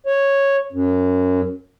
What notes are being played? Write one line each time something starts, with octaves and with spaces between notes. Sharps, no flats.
C#5
F#2